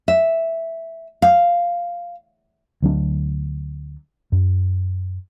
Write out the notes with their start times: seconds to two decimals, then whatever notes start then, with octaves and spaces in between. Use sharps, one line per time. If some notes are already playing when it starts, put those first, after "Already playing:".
0.08 E5
1.22 F5
2.82 D2 F#3 D4
4.32 F#2